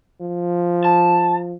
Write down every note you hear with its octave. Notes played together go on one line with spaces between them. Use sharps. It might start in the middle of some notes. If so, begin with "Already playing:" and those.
F3
A5